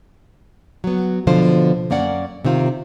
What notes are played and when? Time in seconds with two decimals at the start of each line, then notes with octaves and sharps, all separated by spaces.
0.84 F#3 B3
1.27 B2 D3 F3 F4 C5
1.90 F#2 A#3 C#4 D5 F#5
2.45 C3 D#3 C4 F4